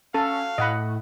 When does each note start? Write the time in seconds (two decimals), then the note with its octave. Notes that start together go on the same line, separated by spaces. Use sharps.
0.14 C#4 F#4 A4 F5
0.58 A2 D#5 F#5 B5